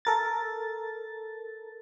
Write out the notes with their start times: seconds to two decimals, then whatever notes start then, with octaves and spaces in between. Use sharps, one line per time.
0.05 A4 A#4 A6